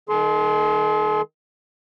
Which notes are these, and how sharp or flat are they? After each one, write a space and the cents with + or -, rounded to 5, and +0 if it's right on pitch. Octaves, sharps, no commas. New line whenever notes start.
D#3 +0 G#4 +45 C6 +0